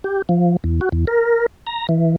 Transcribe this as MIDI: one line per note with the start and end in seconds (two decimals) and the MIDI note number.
0.04 0.22 67
0.29 0.57 53
0.64 0.80 40
0.81 0.89 66
0.92 1.05 40
1.07 1.46 70
1.67 1.87 82
1.89 2.16 52